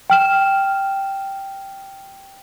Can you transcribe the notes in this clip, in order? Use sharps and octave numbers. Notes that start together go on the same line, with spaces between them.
G5 F6 E7